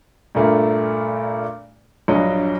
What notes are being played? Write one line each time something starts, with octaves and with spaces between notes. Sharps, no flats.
G2 A#2 A3 A#3
A#1 G2 F#3 D#5